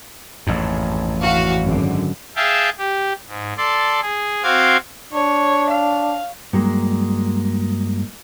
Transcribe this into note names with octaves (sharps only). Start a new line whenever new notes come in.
A1 F2 G#2
E3 F#4 F5
G#1 F#2 D3
G#4 E5 F5 G5 A5
G4
G#2
A4 D5 C6
G#4
C4 F#4 F5 C6 D6 G#6
D4 C#5
F5
G2 F#3 G#3 A#3